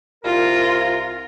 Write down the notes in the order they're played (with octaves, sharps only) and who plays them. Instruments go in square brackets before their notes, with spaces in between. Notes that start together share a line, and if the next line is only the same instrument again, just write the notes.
[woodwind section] C2 A#4 [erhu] F4